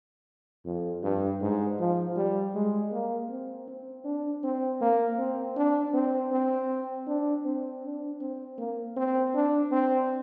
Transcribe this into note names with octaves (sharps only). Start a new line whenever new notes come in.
F2
G2
G#2
F3
G3
G#3
A#3
C4
C4
D4
C4
A#3
C4
D4
C4
C4
D4
C4
D4
C4
A#3
C4
D4
C4